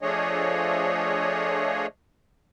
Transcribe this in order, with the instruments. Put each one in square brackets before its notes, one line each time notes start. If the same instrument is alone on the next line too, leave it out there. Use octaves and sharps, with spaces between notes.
[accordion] F3 A3 D4 G#4 C#5 D#5